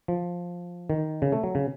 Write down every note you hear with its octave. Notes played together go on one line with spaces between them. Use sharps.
F3
D#3
C#3
A3
F#3
C#3